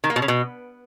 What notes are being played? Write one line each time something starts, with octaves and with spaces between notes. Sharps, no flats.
D#3
A#3
B2
C#3
B2